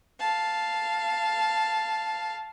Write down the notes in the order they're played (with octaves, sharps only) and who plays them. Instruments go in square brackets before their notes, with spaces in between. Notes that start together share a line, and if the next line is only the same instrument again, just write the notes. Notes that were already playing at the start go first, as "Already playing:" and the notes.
[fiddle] F5 A5